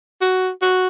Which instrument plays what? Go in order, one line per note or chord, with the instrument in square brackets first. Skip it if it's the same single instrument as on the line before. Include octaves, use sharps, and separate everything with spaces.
[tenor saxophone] F#4
F#4